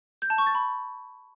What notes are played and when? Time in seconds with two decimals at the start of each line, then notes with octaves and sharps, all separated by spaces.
0.22 G6
0.30 A5
0.38 C#6
0.47 A6
0.55 B5